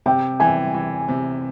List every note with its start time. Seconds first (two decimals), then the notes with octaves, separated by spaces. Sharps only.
0.06 C3 G5
0.40 E3 G#5
0.74 E3
1.08 C3